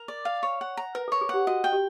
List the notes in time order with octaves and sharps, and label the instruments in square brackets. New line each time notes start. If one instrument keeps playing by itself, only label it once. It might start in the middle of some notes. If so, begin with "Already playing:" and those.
Already playing: [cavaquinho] A#4
D5
F5
C#5
F#5
A#5
[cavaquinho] A#4 [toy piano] B4
[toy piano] A4
[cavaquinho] C#5
[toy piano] G#4
[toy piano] G4 [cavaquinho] F#5
[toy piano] F#4 [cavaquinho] D#5
[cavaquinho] G5
[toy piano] G4